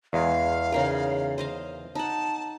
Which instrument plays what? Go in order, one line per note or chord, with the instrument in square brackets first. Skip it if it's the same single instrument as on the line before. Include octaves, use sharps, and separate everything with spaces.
[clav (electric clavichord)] E2 G#3 [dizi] F5
[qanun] C#3 D#4 A#4
C5 D#5 F5
[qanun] D#4 F#5 [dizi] A5